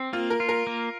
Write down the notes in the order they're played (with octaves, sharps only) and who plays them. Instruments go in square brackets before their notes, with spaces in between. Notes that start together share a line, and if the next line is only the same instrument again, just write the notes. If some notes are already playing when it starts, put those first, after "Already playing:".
Already playing: [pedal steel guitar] C4
[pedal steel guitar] A#3 [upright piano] F4
[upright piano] A#4
[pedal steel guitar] F4
[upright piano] A#4
[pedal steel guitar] A#3